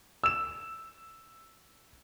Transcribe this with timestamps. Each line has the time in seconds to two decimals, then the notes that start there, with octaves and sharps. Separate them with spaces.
0.24 E6 E7